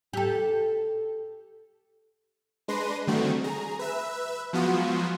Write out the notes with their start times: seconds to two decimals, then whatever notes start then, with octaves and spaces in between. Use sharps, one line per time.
0.13 G4 A4
2.68 G#3 D4 B4 C6 A#6 D#7
3.07 D3 D#3 G3 A3 C4 F#4
3.44 G#4 A#5
3.79 B4 E5 E6
4.53 F3 F#3 G#3 B3 F4 F#4